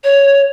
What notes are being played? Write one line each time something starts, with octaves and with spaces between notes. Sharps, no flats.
C#5